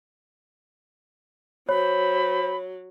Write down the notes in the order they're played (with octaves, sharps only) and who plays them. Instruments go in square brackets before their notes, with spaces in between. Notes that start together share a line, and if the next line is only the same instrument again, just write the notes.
[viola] F#3 [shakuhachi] C5 [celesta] C#5 [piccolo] B5